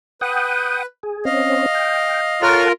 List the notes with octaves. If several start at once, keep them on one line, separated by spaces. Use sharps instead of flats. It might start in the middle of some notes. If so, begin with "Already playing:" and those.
B4 F#5 G5 D#6
G#4
C4 C#4 D#5 F5
G5
F4 A4 A#4 C#5 F#5 A5 F6